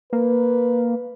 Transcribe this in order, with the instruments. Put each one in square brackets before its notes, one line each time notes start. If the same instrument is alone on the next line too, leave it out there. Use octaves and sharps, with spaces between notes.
[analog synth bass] A#3 [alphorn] B4